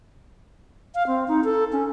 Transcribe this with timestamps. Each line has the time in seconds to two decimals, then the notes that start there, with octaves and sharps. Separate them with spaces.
0.95 F5
1.07 C4
1.28 D#4
1.44 A4
1.73 C#4